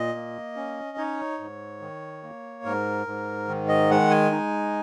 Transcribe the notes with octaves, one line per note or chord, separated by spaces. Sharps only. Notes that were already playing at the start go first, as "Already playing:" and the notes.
Already playing: A#2 D#5
A#3
C#4
D#4 C#5
G#2
D#3
A#3
G#2 A#4
G#2
D#3
D#5
G#3 F#5
G#5
D#4